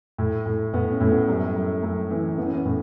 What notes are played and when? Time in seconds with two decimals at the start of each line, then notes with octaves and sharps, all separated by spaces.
0.18 A2
0.46 A2
0.73 A2 B3
0.92 C#4
1.00 A2 A3
1.11 B3
1.28 F#2 G3
1.55 F#2
1.83 F#2 A3
2.10 E3
2.38 E3 B3
2.46 C#4
2.56 B3
2.65 A2